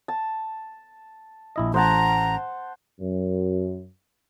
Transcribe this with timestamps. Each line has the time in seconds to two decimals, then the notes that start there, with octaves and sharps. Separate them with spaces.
0.08 A5
1.56 A#1 E4 D#5
1.74 A1 A2 C5 F#5 A5 A#5
3.00 F#2